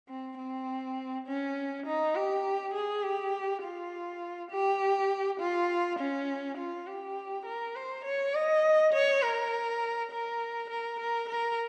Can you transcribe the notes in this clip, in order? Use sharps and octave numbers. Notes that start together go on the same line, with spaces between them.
C4
C4
C#4
D#4
G4
G#4
G4
F4
G4
F4
C#4
F4
G4
A#4
C5
C#5
D#5
C#5
A#4
A#4
A#4
A#4
A#4